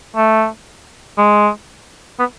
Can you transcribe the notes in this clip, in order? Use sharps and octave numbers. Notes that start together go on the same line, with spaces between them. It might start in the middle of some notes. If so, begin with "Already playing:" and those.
A3
G#3
B3